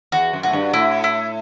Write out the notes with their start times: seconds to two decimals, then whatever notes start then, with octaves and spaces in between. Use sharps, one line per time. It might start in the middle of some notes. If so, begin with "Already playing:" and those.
0.12 E2 F#4
0.33 F#2
0.43 A2 F#4
0.53 G2
0.74 A2 E4
1.04 E4